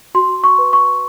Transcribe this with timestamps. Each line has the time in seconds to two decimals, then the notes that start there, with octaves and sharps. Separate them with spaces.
0.15 F#4 C6
0.44 C#6
0.58 B4
0.73 C#6